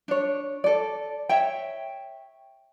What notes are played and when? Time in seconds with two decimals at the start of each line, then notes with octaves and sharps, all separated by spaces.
0.08 D4 C#5
0.64 A4 D5
1.29 C#5 E5 G5